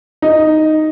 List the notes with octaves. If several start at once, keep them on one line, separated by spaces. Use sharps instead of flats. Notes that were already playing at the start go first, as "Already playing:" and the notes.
D#4